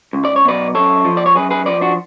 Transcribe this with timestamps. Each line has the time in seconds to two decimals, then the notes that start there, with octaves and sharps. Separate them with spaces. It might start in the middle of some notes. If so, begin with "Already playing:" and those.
0.13 C#2
0.25 D5
0.36 C#5
0.45 B2 F#3 B4 D5
0.75 F#2 A4 C#5
1.05 F3
1.17 D5
1.26 C#5
1.36 F#2 G#4 B4
1.50 G#4 B4
1.66 F3 B4 D5
1.81 D4 F#4